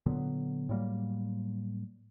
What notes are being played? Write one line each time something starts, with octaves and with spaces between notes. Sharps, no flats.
A#2 D3 F#3 B3
A2 F#3 G3 A#3